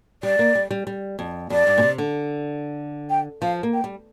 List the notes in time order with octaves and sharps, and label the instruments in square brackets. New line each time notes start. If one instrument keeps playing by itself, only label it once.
[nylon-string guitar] G3 [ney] D5
[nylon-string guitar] A#3
G3
G3
G3
F2
[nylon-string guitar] F2 [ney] D5
[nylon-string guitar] G2
A#2
C3
D3
[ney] G5
[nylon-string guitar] F3 [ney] F5
[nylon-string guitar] A#3
[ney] G5
[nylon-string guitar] G3